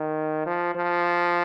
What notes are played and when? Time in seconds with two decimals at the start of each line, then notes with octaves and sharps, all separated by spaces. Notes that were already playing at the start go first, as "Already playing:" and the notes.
Already playing: D#3
0.46 F3
0.75 F3